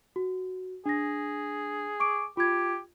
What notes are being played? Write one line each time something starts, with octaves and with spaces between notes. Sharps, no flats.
F#4
D4 G#4 A#6
C#6 D6 D7
F4 G4 G#6